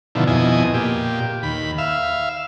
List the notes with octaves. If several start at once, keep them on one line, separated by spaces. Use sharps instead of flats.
B2 D3 D#3 F3 E4
F2 B2 E4 D#5 G#5
A#2 G4
D#2 B5
E5 F5